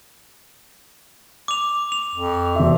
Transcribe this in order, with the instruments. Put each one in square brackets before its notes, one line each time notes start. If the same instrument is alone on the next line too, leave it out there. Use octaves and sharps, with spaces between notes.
[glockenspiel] D6 F7
F7
[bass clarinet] F2
[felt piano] E1 E5